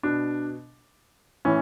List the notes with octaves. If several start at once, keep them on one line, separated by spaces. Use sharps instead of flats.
B2 D4
A2 E3 C#4